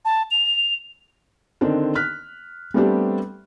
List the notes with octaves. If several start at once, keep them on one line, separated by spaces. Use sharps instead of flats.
A5
F7
D3 D#3 C4 D4
F6 F#6 B6
G3 A3 B3 C4 D4 G4